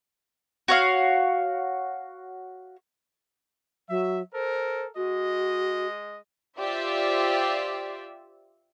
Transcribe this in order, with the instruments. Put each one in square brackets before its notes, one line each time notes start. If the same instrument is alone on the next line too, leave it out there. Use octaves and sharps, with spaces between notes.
[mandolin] F#4 C#5 F5
[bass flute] F#3 [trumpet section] E5
[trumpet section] A4 A#4 [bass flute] C5
[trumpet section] G#3 D#5 [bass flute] F#4
[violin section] F4 G4 C5 D5 E5